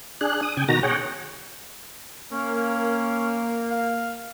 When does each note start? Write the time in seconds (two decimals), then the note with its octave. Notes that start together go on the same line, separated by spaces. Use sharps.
0.21 D4 G#4 F#6
0.42 D#6
0.57 C#3 G5 G#5
0.69 B2 D#3 F#4 A#5 A#6
0.83 G#4 C#5 F#5 G5
2.32 A#3 C#4
3.71 F5